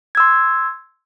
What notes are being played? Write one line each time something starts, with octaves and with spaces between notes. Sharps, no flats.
C6 E6 G#6